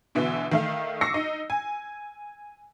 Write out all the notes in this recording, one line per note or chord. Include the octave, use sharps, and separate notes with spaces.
B2 D3 E3 E5
D#3 A3 F5
C#6 D6 E6 A#6 C7 C#7
D#4
G#5